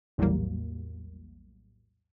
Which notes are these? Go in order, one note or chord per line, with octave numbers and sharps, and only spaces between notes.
A#1 E2 A2 F#3 G3 A#3